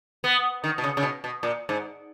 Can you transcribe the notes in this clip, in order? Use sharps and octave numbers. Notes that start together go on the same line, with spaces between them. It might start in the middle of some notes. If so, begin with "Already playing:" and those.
B3
D#3
B2
C#3
C#3
B2
B2
A#2
G#2